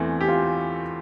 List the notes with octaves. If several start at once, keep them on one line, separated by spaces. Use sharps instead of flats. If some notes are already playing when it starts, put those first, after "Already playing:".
Already playing: E2 E3 A3 C4
G4
F4